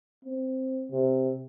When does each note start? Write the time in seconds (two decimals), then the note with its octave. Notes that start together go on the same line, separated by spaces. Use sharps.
0.25 C4
0.91 C3